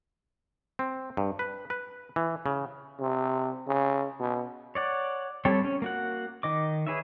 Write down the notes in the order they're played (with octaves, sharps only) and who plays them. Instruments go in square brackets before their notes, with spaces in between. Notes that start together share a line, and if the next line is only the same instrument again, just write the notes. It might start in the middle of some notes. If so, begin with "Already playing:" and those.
[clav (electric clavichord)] C4
G2
B4
B4
E3
C#3
[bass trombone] C3
C#3
B2
[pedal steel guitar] C#5 D5 F#5
G3 C4 G4 A4 C#5
C#4
A#3 F#4 F#5
D#3 D#5 D6
G#4 B4 C#5 E5